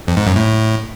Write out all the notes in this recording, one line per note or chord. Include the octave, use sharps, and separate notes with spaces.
F2
G#2
F#2
A2